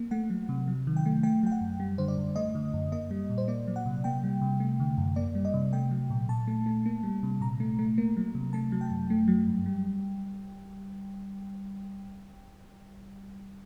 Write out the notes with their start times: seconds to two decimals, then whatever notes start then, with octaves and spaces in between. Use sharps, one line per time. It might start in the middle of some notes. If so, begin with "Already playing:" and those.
Already playing: A#3
0.11 A3 F#5
0.30 F#3
0.49 C3
0.67 F#3
0.87 D#3
0.96 G5
1.06 A3
1.23 A3 G5
1.43 F#3 G5
1.52 F#5
1.61 F#2
1.80 G3
1.98 D3 C5
2.08 D5
2.18 F#2
2.36 A3 D#5
2.55 D3
2.74 F#2
2.92 A#3 D#5
3.11 G3
3.30 A#2
3.38 C5
3.48 A#3 D5
3.67 F#3
3.76 F#5
3.86 C3
4.04 A#3 G5
4.24 G3
4.41 C3
4.60 A3
4.80 D3
4.98 F#2
5.16 A#3 D5
5.35 G3
5.45 D#5
5.54 C3
5.73 A3 G5
5.91 F#3
6.10 A#2
6.29 A#2 A5
6.47 A3
6.66 A3
6.86 A#3
7.03 G3
7.23 C3
7.41 A#2 A#5
7.60 A3
7.79 A3
7.98 A#3
8.17 F#3
8.35 C3
8.53 A3 A5
8.72 F#3
8.81 G5
8.91 F#2
9.10 A3
9.28 F#3
9.47 G2
9.66 G3